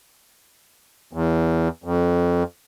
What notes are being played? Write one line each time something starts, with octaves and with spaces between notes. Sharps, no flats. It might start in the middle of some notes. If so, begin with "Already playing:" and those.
E2
F2